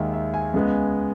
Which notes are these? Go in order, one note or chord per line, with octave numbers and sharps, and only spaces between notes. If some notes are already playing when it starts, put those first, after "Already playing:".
Already playing: D#2 D#3 G#3 E5
E5
G#5
C#2 C#3 G#3 B3